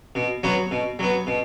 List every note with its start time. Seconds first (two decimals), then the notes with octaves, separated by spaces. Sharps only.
0.15 B2
0.43 F#3 B3 F#4
0.71 B2
0.99 F#3 B3
1.27 B2